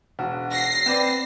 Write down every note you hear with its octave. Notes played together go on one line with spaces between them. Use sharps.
E1 F#4
A#6 C7
C4 B4 D5